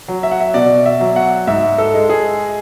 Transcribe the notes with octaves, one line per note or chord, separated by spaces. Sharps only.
F#3
E5
F#5
E5
B2 D5
E5
F#3
F#5
G#2 E5
A4
G#3
G#4